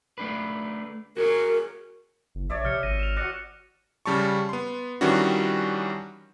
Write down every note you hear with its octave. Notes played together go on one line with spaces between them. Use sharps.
A3 D4 B4
F#4 G#4 A#4 C#5
F#1
A#1 C#5 D5 E5
C3 F6 G6 C#7
G#1 A#6 D#7
E7 F7
F#4 D5 F#6 A#6 C#7
C#3 G3 A5 C#6
B3 C6
D#3 E3 G3 C#4 D4 F#4